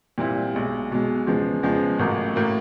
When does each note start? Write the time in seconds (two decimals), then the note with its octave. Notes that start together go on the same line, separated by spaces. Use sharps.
0.18 A#2 G3 C4 E4
0.54 B1 B2 G#3
0.91 B1 B2 G#3
1.27 E2 C#3 F3 G#3 B3
1.63 E2 C#3 F3 G#3 B3
1.99 A1 A2 F#3 A#3
2.36 A2 F#3 A#3